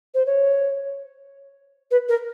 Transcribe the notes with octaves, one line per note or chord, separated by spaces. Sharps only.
C5
C#5
B4
A#4